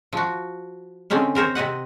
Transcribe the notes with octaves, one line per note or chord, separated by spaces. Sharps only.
F3 F#4
D3 C4 C#4 D#4
C4 A#4 C5 C#5
C3 C4 D#5 F#5